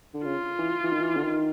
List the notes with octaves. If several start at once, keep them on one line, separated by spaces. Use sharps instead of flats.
D3
C#3 F4
E3
E3
D#3
E3
D3
D#3